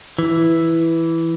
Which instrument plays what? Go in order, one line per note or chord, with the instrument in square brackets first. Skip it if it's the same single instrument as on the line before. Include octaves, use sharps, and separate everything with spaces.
[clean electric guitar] E3